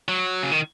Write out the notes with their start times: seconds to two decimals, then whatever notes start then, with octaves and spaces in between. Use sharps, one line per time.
0.08 F#3
0.43 C#3
0.52 D#3